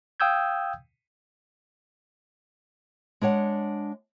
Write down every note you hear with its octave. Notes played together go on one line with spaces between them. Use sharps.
F5 G5 D#6 E6 G6 G#6
G#3 D4 C#5 F#5